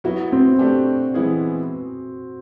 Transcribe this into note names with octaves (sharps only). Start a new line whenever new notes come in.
F#3 B3 E4 F#4
C4
A3 D4 G4
E3 G#3 B3 E4 G#4